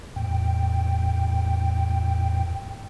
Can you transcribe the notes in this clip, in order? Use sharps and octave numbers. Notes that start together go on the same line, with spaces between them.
E2 A2 G5